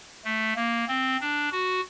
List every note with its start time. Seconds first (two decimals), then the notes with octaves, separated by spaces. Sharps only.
0.25 A3
0.56 A#3
0.88 C4
1.20 D4
1.52 F#4